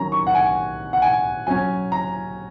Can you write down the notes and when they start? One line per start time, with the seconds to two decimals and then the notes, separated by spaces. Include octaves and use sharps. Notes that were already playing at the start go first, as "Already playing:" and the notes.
Already playing: D#3 F#3 C#4 A#5
0.12 C#6
0.27 F#5
0.35 G#5
0.93 F#5
1.02 G#5
1.47 F#3 C#4 G#5
1.92 A#5